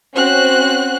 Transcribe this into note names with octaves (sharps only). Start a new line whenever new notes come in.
C4 C#4 F#4 C5 F#6